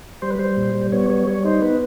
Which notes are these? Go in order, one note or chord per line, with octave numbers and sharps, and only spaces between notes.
G3 C5
B4
G3 C5
A#2
G3
B3 C#5
G3 C#5
G3 C#5
D#4 C5
B3 B4